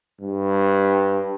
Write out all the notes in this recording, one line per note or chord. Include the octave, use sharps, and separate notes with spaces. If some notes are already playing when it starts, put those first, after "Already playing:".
G2